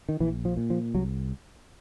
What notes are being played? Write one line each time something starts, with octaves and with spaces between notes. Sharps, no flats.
D#3
A#1 E3
F3
A#2
F3
C2 F#3